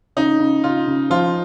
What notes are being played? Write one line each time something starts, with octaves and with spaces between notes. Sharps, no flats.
C#3 D#4
C#3
C#3 F4
C#3
F3 F4